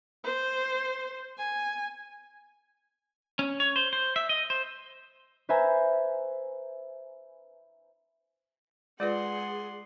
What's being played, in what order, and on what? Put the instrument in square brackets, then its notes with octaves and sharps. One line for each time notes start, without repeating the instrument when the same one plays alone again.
[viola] C5
G#5
[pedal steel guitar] C#4
C#5
C5
C5
E5
D#5
C5
[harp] B4 C5 E5 G#5 A#5
[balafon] G#3 F4 B4 [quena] G#4 [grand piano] D5 [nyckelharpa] F#5 C6